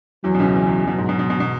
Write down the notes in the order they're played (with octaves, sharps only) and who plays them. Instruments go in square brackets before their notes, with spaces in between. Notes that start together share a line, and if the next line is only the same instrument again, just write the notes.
[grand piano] E2 E3 [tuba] F#3
[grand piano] B2
C#2 C#3
E2 E3
E2 E3
[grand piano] B2 [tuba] F#3
[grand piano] G#2
B2
B2
B2
B2